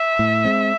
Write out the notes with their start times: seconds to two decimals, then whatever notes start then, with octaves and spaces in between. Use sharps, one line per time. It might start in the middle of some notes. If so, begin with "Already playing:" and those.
Already playing: E5
0.19 A2
0.45 G#3 C4